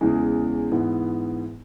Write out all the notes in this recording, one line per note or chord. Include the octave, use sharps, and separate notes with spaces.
E2 C#3 E3 G#3
G#2 E3 B3 E4